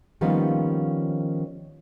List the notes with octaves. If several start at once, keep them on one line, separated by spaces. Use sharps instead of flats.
D#3 F3 G3 A#3 B3 C#4